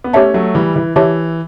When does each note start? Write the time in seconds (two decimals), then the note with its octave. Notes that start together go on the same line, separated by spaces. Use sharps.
0.04 B3
0.13 A3 C#4 G4 C#5 E5 A5
0.34 F#3 A3
0.55 E3 G3
0.76 E3
0.96 E3 G4 C#5 E5 A5